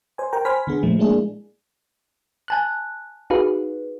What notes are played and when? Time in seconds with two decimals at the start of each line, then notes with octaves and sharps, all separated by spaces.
0.18 C5 G#5
0.33 A#4 G5 A#5
0.45 C5 G#5 B5 F6 B6
0.67 D3 B3 G#4
0.83 A#2 F3 A3
0.99 G#3 A#3 D4 E4 G#4
2.48 G#5 A5 F#6
3.30 D#4 F#4 G#4 B4 F5